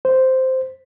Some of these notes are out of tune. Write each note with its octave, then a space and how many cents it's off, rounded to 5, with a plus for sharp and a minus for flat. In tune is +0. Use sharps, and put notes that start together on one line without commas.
C5 -5